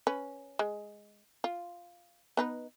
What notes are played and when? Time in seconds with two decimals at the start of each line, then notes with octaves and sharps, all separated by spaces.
0.07 C#4 B4
0.59 G#3
1.44 F4
2.37 B3 D#4 B4